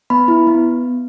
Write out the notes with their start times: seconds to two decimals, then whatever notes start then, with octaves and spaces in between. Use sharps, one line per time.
0.10 B3 B5
0.28 E4
0.47 B3